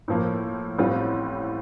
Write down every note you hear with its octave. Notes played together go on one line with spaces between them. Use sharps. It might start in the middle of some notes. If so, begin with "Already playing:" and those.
A2 F3 A#3
A1 A2 G3 C4 F4